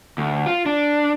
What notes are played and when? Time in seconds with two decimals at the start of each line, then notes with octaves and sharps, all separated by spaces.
0.18 D2
0.46 F4
0.66 D4